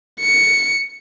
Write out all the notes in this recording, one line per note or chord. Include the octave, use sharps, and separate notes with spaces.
C#7